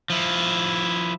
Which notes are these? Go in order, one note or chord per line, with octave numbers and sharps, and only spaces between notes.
F3 E4